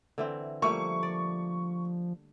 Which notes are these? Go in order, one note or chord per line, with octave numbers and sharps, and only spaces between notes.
D3 E3 C4
F3 G3 A3 A#3 C#6
D5